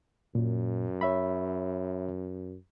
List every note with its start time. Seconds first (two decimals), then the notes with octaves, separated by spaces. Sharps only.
0.35 F#2 A#2
1.01 C#5 E5 B5